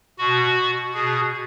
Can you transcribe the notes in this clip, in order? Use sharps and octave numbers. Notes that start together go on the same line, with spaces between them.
B2 F#4
B2 G#4